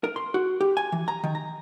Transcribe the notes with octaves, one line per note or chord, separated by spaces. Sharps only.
A#4
C6
F#4
G4
G#5
E3
A#5
D#3
A#5